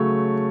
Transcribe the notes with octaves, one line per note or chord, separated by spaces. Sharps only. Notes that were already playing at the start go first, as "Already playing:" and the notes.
Already playing: C#3 F#3 A3 C#5